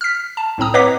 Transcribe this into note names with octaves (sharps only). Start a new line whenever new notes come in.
F6 B6
A5
C2 A2 C4 A#5 D#6
B4 C#5 D#5 F#5 D6 B6